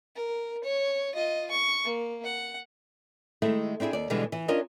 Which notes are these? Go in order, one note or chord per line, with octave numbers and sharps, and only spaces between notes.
A#4
C#5
F4 D#5
C#6
A#3
F#5
D#3 G#3 A3 E4
C4 D4 E4 F#4 G#4
D#2 D5
B2 D3 E3 G3 G#3
E3
C#4 D4 F4 A#4 D#5